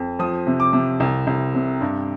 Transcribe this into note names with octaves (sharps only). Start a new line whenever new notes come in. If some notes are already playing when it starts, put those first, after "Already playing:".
Already playing: F2
F3 D#6
C3
D6
C3
C2
C2
C3
G2